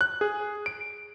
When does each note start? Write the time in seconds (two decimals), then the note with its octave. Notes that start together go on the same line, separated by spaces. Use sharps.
0.01 F#6
0.21 G#4
0.66 D7